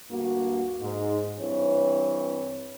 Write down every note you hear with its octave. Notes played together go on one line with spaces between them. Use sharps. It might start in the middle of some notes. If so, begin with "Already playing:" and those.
D2 G2 A#3 F#4
G#2
G2 E3 C4 C#5